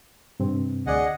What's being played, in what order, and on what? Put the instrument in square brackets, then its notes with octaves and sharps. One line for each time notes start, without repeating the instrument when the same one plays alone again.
[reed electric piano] G2 C3 C4
[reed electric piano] D2 D5 [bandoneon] G#4 D#5 F#5